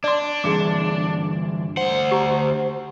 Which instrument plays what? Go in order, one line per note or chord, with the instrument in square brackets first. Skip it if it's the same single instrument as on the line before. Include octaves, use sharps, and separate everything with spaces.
[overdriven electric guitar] D4 [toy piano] D5 C6
[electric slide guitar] G2 D3 E3 [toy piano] G#4 G#5 D6
[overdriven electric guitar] D2 F#5 [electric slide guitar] C5
[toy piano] G4 A#5